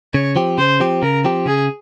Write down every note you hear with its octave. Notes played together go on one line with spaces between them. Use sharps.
C#3 C#5
F3 C4 G4
C#3 C5
F3 C4 G4
C#3 A#4
F3 C4 G4
C#3 G#4